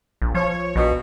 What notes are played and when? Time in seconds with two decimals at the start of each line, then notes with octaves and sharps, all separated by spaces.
0.22 A#1
0.35 F3 C#5
0.76 A#1 B2